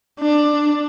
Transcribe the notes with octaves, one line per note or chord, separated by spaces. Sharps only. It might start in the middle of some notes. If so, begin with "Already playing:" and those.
D4